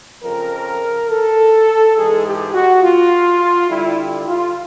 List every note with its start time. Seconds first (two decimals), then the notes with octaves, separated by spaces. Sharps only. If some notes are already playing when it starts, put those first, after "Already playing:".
0.22 F2 C#3 F3 A#4
1.09 A4
1.96 G#2 E3 G#3 G#4
2.25 G4
2.54 F#4
2.83 F4
3.69 G2 D3 G3 E4
4.28 F4